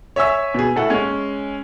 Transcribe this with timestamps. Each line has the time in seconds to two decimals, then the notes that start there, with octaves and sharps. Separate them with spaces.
0.16 C#5 E5 G#5 E6 B6
0.54 B2 G#4
0.76 A2 A4 F#5
0.90 G#3 C#4